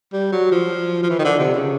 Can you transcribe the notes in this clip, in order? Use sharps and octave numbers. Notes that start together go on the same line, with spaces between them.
G3
F#3
F3
F3
E3
D#3
D3
C3
C#3